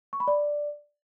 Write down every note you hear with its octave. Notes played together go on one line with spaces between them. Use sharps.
C#6
B5
D5